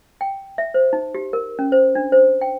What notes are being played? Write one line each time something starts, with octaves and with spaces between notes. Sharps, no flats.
G5
E5
C5
D#4
G4
A#4
C#4
C5
D4
C5
G5